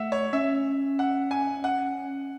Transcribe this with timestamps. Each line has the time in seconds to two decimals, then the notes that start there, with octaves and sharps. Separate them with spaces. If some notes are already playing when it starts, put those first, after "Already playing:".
Already playing: A3 E5 F#5
0.12 C#5
0.33 C#4 E5
0.99 F#5
1.31 G#5
1.64 F#5